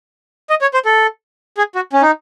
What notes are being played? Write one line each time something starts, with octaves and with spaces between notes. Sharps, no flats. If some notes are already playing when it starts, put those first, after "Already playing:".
D#5
C#5
C5
A4
G#4
F#4
C#4
D#4